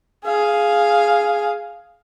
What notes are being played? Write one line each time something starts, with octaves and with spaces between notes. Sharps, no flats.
G#4 F5